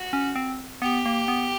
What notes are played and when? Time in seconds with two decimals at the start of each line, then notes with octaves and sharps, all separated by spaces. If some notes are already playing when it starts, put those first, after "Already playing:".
Already playing: F#4
0.13 C#4
0.36 C4
0.82 B3 G4
1.06 A#3
1.28 B3